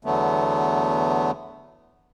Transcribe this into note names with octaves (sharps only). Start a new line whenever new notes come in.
E2 D3 F#3 A3 B3